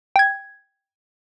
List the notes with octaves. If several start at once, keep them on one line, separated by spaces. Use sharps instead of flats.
G5 G#6